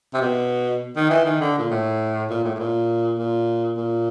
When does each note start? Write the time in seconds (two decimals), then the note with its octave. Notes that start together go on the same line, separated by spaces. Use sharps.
0.14 C3
0.21 B2
0.96 D#3
1.10 E3
1.25 D#3
1.40 D3
1.58 A#2
1.70 A2
2.30 A#2
2.44 A2
2.55 A2
2.59 A#2
3.18 A#2
3.78 A#2